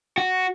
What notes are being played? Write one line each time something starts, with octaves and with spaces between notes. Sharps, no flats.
F#4